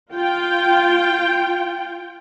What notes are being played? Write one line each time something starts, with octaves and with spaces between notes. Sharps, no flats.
F4 G5